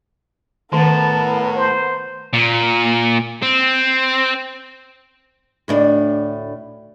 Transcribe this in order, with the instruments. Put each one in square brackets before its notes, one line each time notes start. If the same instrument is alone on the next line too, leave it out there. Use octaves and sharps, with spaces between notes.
[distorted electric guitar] A2 [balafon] D#3 [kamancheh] B3 A#4 [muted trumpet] A5
[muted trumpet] C5
[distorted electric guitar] A#2
C4
[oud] D2 A2 D4